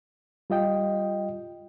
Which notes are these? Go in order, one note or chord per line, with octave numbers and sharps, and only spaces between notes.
G3 F4 D#5 G5